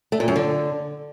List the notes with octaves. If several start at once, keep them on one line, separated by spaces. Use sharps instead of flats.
A3
A#2
F#2
D3